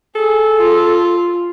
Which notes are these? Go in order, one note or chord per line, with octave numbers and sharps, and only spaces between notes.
G#4 A4
F4